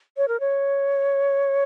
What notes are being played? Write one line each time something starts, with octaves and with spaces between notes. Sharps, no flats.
C#5
A#4
C#5